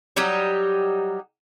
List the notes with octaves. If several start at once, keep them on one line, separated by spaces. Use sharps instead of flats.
F#3 G3 D#4 G4